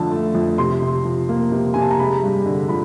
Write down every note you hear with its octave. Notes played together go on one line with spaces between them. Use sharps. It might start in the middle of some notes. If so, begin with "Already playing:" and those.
Already playing: F2 D3 F3 A3 A5
A3
F2
C3 C6
C3
F3
A#3
C3
C3 G#5
A5
A#5
G#3 B5
G2
D3
F3 B5